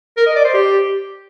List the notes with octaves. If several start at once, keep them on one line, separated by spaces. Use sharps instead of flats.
A#4
D#5
D5
C5
G4